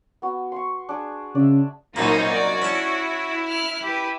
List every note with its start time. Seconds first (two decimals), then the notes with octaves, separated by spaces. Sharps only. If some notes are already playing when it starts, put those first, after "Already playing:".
0.22 B3 F#4
0.52 C6 C#6
0.89 D4 G#4
1.35 C#3 D5 E5
1.96 C2 F#2 A#2 A#3 D#4 F#4 C5 C#5
2.30 D5
2.62 C#4 E4 A5
3.48 F6 F#6
3.83 G4 B4